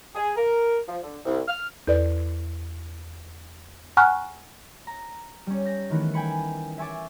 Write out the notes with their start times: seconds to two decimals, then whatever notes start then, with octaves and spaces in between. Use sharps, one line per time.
0.15 G#4
0.36 A#4
0.88 F3
1.03 D3
1.25 C2
1.48 F6
1.88 E2 A4 B4 D5
3.97 F#5 G#5 A#5 C#6 F6 F#6
4.87 A#5
5.47 G3 C#4
5.65 G6 A#6
5.90 D#3 E3 A3 B3
6.14 G5 G#5 B5 C#7
6.78 E5 G#5 C#6 D6 A6